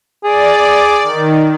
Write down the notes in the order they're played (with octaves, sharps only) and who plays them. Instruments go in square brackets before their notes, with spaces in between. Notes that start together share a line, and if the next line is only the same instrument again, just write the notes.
[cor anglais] G#4 [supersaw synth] D5
[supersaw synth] D#3